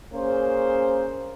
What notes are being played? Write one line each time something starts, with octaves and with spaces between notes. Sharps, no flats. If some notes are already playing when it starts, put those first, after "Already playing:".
A#3 C#4 G#4 A#4 C5